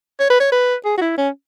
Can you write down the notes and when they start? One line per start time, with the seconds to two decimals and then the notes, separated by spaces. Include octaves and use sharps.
0.20 C#5
0.30 B4
0.40 C#5
0.52 B4
0.85 G#4
0.97 F#4
1.01 E4
1.18 C#4